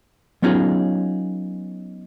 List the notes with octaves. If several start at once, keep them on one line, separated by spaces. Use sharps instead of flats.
F#3 B3 C#4 D#4 F4 G#4